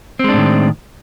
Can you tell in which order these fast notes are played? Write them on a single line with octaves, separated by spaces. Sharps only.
C4 G#3 D4 A2 D#3